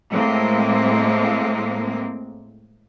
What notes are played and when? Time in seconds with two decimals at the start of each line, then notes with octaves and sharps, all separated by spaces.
0.10 A2 G#3 A#3 C4